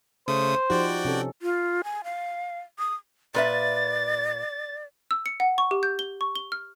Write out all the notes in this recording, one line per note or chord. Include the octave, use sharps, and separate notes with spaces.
C#3 A3 C5 D#6
F3 D#4 F#4 G4 D5 G5
C3 C#4 A4
F4
G#5
F5
D#6
A#2 B4 D5 E5 A6
A6
E6
C#7
F#5
C#6
G4
G6
G7
C#6
G7
F6